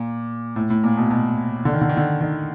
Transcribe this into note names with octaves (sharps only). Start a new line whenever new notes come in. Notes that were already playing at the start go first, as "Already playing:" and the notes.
Already playing: A#2
A2
A2
A#2
B2
B2
D3
D#3
D3
D#3
D3
D#3